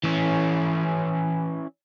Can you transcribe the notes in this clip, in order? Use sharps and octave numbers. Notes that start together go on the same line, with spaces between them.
E3 C#4